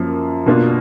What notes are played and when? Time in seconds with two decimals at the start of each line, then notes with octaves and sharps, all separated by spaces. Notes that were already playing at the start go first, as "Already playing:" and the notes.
Already playing: F#2 F3 A#3
0.46 B2 A#3 D4 F4